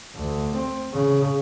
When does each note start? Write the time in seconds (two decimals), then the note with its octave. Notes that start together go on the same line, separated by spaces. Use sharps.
0.16 D2
0.56 C4
0.93 C#3